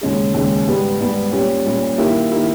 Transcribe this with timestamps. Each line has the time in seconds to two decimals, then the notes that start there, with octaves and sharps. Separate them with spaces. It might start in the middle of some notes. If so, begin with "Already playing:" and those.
0.01 D#2 C#3 G#3 C#4 G#4
0.34 D#2 C#3 G#3 C#4 G#4
0.67 G#2 G3 B3 G4
1.00 G#2 G3 B3 G4
1.32 A#2 G3 C#4 G4
1.66 A#2 G3 C#4 G4
1.98 D#3 A#3 E4 G4
2.31 D#3 A#3 E4 G4